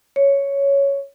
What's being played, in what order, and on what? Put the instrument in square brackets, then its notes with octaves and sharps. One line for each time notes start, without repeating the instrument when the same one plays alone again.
[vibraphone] C#5